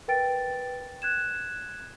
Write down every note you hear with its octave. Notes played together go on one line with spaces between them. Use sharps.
A#4 B4 G5 A6 D7
F#6 G#6 E7